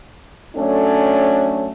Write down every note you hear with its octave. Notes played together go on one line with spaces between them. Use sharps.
F#3 A3 C#4 D4 A4